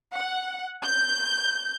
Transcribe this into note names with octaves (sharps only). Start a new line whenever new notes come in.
F#5
G6